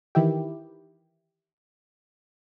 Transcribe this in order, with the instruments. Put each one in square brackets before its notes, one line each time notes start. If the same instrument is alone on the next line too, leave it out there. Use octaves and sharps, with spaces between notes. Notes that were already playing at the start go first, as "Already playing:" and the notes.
[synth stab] D#3 E3 E4 G4